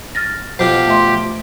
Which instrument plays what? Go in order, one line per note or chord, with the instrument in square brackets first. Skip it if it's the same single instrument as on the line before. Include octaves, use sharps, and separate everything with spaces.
[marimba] F6 A6 A#6
[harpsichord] F2 B2 F3 [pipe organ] G4 [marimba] C5
[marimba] A3 E5 C6